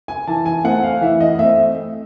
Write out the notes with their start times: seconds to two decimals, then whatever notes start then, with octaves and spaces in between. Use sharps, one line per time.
0.08 G#5
0.27 E3 A5
0.46 G#5
0.64 A3 C4 F#5
0.83 F5
1.01 E3 E5
1.20 D#5
1.39 A3 C4 E5